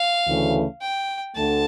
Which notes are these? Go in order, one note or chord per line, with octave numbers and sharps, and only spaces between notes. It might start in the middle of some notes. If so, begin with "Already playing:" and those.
Already playing: F5
D2 C#3 E3 A3
G5
D2 D3 A3 A5